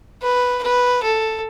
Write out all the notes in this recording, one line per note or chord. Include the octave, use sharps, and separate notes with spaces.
B4
B4
A4